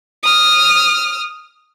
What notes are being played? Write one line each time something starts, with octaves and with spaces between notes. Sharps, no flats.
D#6 F6